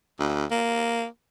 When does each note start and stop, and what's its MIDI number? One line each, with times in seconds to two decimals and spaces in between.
0.20 0.46 38
0.51 1.05 58